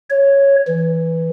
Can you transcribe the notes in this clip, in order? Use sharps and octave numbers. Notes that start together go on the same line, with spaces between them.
C#5
E3